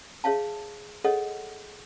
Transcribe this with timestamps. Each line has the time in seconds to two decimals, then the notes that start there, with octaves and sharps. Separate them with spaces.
0.24 G#4 C#5 E5 F5 A5
1.04 G#4 A4 C#5 D#5 F#5